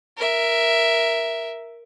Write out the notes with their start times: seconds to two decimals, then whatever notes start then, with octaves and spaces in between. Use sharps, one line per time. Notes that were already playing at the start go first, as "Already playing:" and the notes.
0.17 A#4 E5